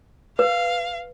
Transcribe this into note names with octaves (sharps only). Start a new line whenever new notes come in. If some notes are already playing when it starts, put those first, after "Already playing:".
B4 F5